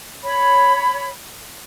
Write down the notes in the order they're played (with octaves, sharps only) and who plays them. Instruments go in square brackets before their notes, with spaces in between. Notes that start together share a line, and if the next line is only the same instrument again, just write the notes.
[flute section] C#5 B5